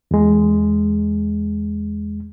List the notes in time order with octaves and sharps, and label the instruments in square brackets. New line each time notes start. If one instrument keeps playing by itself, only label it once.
[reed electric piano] E2 G#3